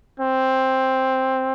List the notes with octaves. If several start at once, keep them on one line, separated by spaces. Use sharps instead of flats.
C4